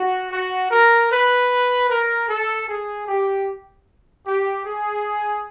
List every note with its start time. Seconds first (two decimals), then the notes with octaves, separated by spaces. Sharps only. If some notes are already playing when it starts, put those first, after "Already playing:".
Already playing: F#4
0.31 F#4
0.70 A#4
1.10 B4
1.89 A#4
2.29 A4
2.68 G#4
3.07 G4
4.26 G4
4.64 G#4